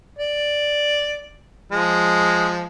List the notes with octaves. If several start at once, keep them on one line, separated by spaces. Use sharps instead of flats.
D5
F3 G#3